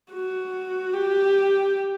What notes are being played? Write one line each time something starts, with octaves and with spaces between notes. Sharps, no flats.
F#4
G4